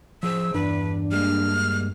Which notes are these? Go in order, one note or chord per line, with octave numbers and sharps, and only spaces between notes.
F3 G#4 C5 E6
E2 G2 D4 B4
G3 G#3 A#3 F6